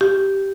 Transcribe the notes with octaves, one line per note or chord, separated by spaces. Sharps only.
G4